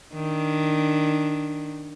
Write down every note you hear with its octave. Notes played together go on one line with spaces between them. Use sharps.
D#3 D4